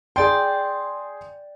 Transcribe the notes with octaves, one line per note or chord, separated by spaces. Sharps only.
G#4 D5 G5 C6